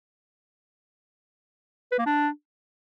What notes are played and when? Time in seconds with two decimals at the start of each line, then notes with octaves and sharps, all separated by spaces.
1.92 B4
1.99 A#3
2.06 D4